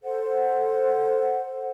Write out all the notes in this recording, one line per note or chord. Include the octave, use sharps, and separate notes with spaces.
A4 C5 F#5